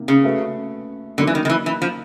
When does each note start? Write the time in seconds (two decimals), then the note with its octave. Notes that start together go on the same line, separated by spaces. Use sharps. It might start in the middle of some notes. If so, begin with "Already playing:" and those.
Already playing: C3 D#3 A#3
0.08 C#3
0.24 A3 C#4 F#4 B4 E5
1.18 D3 F#3 A#3 D#4
1.27 E3
1.35 D#3
1.45 D#3
1.49 E3
1.66 E3
1.82 F3